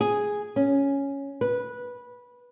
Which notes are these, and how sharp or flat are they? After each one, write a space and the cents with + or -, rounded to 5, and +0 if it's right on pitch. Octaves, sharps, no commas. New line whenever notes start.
G#4 +0
C#4 +0
B4 -15